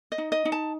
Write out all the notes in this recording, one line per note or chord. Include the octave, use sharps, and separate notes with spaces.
D#5
D#4
D#5
D#4
A5